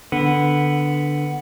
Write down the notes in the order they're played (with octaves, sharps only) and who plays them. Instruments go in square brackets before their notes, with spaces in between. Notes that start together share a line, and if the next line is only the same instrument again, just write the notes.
[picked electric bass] D3 [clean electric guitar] B3